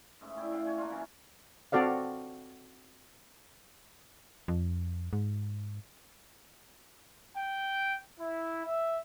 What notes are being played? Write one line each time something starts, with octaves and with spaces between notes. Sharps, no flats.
G#2 C#3 A3
A2 E4 D5 G5
A2 D3 F5 G5
D4 C#5 G#5
A#3 D4 F4
E3 F#3 C#4
C4 F#4 A4 D5 F5
F2
G#2
G5
E4
E5